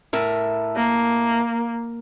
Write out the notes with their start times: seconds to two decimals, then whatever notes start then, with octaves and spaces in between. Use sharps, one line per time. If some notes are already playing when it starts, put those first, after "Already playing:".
0.13 A2 A#4 E5
0.76 A#3